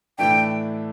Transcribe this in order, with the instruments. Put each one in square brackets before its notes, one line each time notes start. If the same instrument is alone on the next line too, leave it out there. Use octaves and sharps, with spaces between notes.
[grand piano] A2 E3 A3 D4 [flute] G5